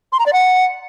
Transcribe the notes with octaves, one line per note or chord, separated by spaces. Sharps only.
C6
A#5
D5
F#5